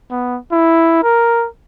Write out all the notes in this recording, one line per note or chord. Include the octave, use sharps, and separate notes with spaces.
B3
E4
A#4